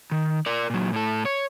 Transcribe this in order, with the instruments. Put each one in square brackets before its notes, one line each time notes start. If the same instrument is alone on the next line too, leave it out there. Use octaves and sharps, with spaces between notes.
[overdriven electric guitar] D#3
A#4 D5
A#2 F#3
A2 A4
C#5